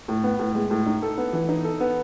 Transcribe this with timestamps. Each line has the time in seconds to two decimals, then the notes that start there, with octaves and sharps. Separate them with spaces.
0.08 A2
0.23 B3
0.39 A2
0.55 G#3
0.71 A2
0.86 D#4
1.02 A4
1.18 B3
1.33 E3
1.48 D#4
1.64 A4
1.80 B3